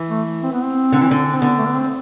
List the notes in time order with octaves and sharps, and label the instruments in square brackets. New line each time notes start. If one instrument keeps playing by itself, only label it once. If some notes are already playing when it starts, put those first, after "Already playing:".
Already playing: [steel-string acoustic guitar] E3
[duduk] A3
C4
B3
C4
[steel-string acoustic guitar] D3
E3
D3
[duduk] C4
[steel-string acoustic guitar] D3 [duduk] B3
[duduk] A3
B3
C4